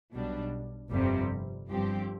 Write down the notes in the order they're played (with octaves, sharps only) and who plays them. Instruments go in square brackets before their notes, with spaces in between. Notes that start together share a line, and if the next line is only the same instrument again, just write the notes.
[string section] B1 B2 G3 D4
G1 F2 C3 G3 C4
G1 G2 F3 C4 G4